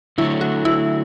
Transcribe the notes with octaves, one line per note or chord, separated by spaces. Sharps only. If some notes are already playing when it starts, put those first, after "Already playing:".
D3 F#3 A3 E4
F#4
E4